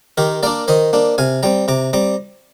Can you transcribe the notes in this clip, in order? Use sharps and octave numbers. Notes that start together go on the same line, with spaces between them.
D#3 G4 A#4
A#3 D4 A#4 D5
D#3 C5 D#5
A#3 D4
C3 F5 G#5
G3 C4 G5 A#5
C3 A#5 D6
G3 C4 A#5 D6